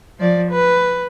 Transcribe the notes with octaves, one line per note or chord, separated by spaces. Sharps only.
F3 D5
B4